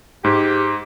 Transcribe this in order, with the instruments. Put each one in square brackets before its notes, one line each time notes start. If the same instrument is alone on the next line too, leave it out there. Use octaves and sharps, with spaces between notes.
[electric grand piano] G#2 [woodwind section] G4